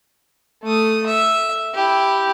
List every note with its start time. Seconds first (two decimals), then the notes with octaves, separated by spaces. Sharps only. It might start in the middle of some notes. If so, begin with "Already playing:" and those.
0.63 A3 D#6
1.06 E5
1.74 E4 G4